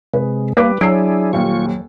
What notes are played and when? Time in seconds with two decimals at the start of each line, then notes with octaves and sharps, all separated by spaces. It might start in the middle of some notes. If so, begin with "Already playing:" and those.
0.14 C3 G#3 B4
0.57 G3 A#3 B4 D6
0.81 F#3 D4 E4 G#4 E6 C7 D7
1.33 D#1 D#2 F4 C#6